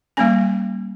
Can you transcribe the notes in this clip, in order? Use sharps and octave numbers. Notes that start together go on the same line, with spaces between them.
G3 A#3 C#4 G#5